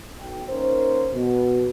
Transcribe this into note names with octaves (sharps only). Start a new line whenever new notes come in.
B1 G5
A#3 C#4 D#4 A#4 C5
B2